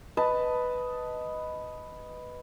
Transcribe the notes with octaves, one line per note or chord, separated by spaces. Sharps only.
B4 D#5 A5